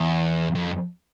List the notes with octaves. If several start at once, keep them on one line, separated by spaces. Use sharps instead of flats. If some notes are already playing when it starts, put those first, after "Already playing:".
Already playing: E2
F2